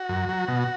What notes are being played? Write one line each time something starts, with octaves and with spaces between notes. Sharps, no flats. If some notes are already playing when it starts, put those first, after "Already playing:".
Already playing: F#4
F#2
F#3
B2